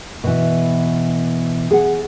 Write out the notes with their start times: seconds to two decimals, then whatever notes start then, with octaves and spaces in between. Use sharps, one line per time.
0.24 B2 E3
1.71 G#4 F#5